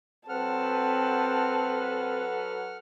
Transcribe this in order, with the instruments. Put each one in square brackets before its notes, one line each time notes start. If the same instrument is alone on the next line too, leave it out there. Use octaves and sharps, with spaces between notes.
[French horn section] F#3 A4 B4 [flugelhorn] C4 [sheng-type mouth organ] F#5 F6 [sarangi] A5